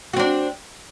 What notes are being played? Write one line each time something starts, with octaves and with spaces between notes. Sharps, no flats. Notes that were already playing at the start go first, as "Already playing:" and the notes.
C4 D4 F#4